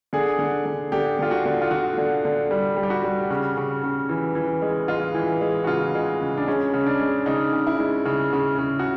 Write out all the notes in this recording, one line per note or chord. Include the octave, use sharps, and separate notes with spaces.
D3 G#4
D3
D3
D3 G4
D3 F4
F#4
D3
F4
D3 F#4
D3
D3
G3
G3
G4
F#4
G3
C#3
C#3
C#3
E3
E3
G#3
G#3 F4
E3
G#3
F#4
C#3 F4
G#3
C#3
D4
G#3 C#4
C#3
D4
G#3
C#3 D#4
C#3
E4
G#3
C#3
C#3
C#3
F#4